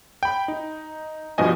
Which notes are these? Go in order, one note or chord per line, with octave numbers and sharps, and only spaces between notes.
G5 B5
D#4
G2 B2 F3 D#5 G#5